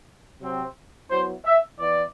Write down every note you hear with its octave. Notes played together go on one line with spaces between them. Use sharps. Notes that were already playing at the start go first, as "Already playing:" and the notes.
C3 F#3 C4
F#3 B3 E4 C5
E5
E3 B3 E4 D5